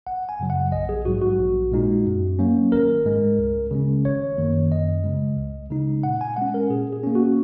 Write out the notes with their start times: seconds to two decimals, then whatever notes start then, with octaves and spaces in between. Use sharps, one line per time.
0.07 G#1 F#5
0.29 G#5
0.40 F#2 C#3 F#3
0.50 F#5
0.72 A#1 D#5
0.89 G#4
1.05 G#2 F#3 F#4
1.22 F#4
1.39 A#1
1.71 A#2 G#3 D#4
2.05 F#2
2.39 F#3 A#3 C#4
2.72 G#1 A#4
3.05 G#2 G#3
3.39 C#2
3.71 C#3 G#3 C#4
4.05 G#1 C#5
4.37 F#2 D#3 A#3
4.71 F#2 D#5
5.04 C#3 G#3
5.37 C#2
5.70 C#3 G#3 D#4
6.03 A#2 F#5
6.21 G#5
6.37 G#3 C#4 F#5
6.54 A#4
6.70 A#2 G#4
6.93 G#4
7.03 A#3 C#4
7.15 F#4